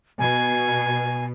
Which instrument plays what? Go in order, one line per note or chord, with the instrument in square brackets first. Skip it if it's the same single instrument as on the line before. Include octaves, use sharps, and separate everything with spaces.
[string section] B2 [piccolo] G#5